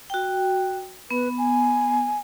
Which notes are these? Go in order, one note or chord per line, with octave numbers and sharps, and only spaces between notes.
F#4 G5
B3 B4
G#5